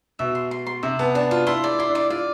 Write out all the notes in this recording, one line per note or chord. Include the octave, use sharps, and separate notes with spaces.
B2 E5
C6
C6
C6
C3 E5
B3 A5
D4 A5
F4 A5
E4 C6
D5
E4 C6
D4
D5
F4 D5